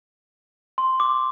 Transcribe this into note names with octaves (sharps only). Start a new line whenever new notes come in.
C6
D6